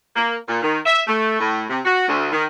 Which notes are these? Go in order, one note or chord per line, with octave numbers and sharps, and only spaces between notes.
A#3
A#2
D#3
E5
A3
A2
C3
F#4
D2
D#3